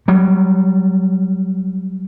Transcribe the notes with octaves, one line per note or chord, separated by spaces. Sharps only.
F#3 G3